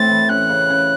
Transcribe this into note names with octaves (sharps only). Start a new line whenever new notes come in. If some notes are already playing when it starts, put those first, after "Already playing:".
Already playing: A2 C4 A6
E3
C#4 F#6
C#3
C#4